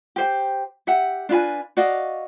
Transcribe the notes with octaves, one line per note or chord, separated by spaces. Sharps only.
G4 C5 G5
G4 E5 F#5
D4 F4 B4 G#5
F#4 D5 D#5 F5